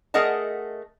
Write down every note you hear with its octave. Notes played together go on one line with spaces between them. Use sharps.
A3 G#4 A#4 D#5 F#5 A5